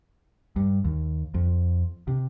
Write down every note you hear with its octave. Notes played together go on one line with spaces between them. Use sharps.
G2
D#2
F2
C3